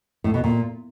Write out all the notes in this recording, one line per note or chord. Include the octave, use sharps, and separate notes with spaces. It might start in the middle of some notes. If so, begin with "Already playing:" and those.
A2
B2
A#2